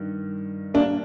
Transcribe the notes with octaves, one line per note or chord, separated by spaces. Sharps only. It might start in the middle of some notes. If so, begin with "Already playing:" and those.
Already playing: G2 D#3
A#3 D4